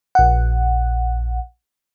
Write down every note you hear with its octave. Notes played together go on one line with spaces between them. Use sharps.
A#1 F#5